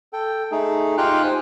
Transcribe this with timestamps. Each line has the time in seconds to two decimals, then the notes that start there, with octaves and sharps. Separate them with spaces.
0.13 A4 G5
0.51 A3 D#4 G#4
0.98 D#4 F4 G4 F5 G5 F#6
1.24 C5 G#5